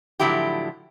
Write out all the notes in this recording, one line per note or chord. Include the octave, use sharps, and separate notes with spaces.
A2 D3 F3 F#3 E4 G4